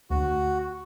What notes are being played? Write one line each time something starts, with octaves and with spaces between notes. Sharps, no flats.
D2 F#4